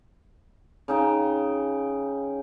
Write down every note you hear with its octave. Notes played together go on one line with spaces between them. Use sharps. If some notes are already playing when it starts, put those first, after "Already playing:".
C#3 D#4 G5